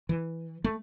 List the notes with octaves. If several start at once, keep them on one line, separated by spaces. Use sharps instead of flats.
E3
A3